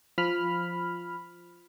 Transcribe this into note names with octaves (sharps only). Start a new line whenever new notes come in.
F3 B5 F6